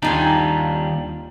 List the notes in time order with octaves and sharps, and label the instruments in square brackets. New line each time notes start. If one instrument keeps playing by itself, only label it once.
[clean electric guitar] D#2 G3 D4 [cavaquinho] D#4 F4 G#5